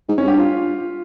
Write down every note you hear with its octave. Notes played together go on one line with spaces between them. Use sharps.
G#2
C#4
G2 G4
F4